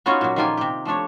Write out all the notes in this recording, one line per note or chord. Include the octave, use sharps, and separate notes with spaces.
B3 C#4 D#4 F4 F#4 C#5
A#2 F#3
D#3 F3 A#3 F4 G4 G#5
C3 G4
F3 A3 D4 C#5